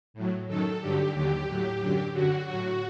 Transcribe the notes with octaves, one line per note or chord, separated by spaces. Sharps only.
A2 F#3
F#2 D#3 F#3 A4
G2 D3 F#3 G4
D#2 D3 F#3 G4
A2 F#3
F#2 D3 F#3
F#2 D3 F#3 F#4
A2 F#3 F#4